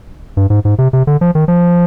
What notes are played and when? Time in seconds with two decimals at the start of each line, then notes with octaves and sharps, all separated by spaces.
0.37 G2
0.50 G#2
0.65 G#2
0.78 C3
0.93 C3
1.07 D3
1.21 F3
1.35 D#3
1.48 F3